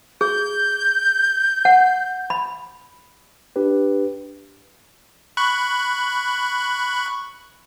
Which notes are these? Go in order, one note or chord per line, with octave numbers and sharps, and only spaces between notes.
G#4 G6
F#5
B5
D4 G4 B4
B5 C#6 F#6